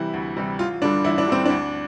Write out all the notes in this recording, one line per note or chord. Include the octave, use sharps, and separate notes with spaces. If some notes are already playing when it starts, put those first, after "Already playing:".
Already playing: C3 E3 G3 E4
D2
C3 E3 G3
A1 F4
G2 D3 G3 D4
A1 E4
D4
G2 D3 G3 C4
D2 D4